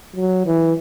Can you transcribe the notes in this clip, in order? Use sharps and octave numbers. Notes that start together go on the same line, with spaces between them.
F#3
E3